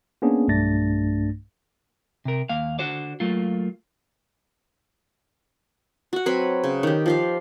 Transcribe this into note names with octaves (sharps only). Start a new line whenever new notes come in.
A#3 B3 C#4 D4 G#4
B1 G2 A3 D4 A6 A#6
C3 A#4
D#2 A#3 F5
D3 F#4 C5 D5
F#3 A3 A#3 F4
F#4 F#5
F#3 C4 B4 B5
C#3
D#3 G4
F3 G4 F5